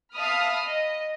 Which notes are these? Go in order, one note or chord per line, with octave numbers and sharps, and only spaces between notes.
E5 F5 A5 B5 D#6 F6
D#5